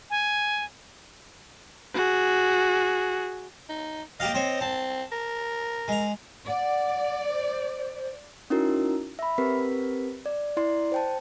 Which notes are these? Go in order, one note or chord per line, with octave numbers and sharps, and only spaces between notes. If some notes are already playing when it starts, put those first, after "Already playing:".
G#5
F#4 G#4
D#4
A#3 G4 D#5 F5
C4 C5 C#5
C4 A5
A#4
G#3 A#5
D5 F#5
C5
C#4 D#4 E4 F#4 A#4
E5 B5
C4 G4 A#4 B4 B6
D5
E4 D5 C6
C5 G5 A5